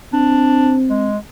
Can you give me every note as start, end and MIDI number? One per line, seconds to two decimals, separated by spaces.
0.13 1.09 60
0.13 0.75 62
0.89 1.17 56